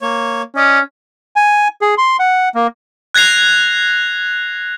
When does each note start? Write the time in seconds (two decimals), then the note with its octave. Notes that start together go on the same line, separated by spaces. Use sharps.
0.01 A#3 C#5
0.56 C#4 D5 D#5
1.36 G#5
1.82 G#4
1.98 C6
2.19 F#5
2.55 A#3
3.14 F#6 G#6 A#6 C7 F7